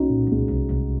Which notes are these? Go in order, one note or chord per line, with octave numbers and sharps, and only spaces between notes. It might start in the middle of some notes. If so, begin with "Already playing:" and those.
Already playing: C2 C#4 D#4 F#4
A#2
C2 G#3
C2
C2